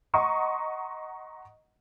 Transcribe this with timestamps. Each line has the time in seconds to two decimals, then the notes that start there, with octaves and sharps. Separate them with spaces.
0.14 D#5 F#5 A#5 C6 C#6 D#6